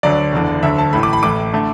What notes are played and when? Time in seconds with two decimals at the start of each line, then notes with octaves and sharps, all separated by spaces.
0.03 D2 D3 F#3 D5
0.33 F#1 E2 D3
0.63 D2 D3 F#3 E5
0.78 A5
0.93 A1 A2 A3 B5
1.03 D6
1.13 B5
1.23 A1 A2 A3 D6
1.53 D3 A3